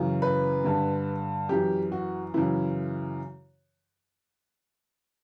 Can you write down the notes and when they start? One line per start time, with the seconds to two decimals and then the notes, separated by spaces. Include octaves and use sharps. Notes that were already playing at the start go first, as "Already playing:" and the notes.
Already playing: F#2 C#3 E3
0.22 B4
0.64 G2 D3
1.49 F#2 E3 G4
1.92 F#4
2.34 F#2 C#3 E3 E4